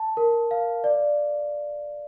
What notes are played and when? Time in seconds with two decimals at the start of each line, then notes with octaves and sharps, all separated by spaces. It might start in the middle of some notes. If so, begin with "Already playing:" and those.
Already playing: A5
0.17 A#4
0.51 F5
0.84 D5